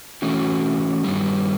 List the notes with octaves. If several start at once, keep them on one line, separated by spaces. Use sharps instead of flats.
E3 A3 C#4 F#4
G2 D#3 G3